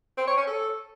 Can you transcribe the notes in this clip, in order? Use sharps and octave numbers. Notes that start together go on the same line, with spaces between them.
C4
C#5
C#4
A4